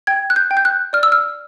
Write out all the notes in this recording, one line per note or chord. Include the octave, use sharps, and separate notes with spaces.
G5 G#6
F#6
G6
G5
G6
F#6
D5 F6
E6
F6